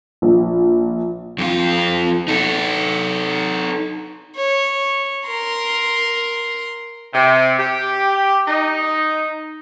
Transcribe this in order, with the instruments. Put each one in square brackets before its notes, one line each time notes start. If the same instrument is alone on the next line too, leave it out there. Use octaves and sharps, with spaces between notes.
[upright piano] A#1
[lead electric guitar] F2 F4
D#4 A4
[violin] C#5
A#4 C6
[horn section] C3
G4
D#4